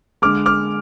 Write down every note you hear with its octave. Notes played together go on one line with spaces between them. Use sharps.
D3 G#3 D6 F6
D6 F6